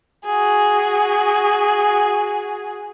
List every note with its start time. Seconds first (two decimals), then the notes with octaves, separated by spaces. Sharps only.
0.24 F#4 G#4